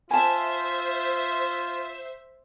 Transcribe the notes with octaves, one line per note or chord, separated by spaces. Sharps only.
F4 C5 E5 G#5 A5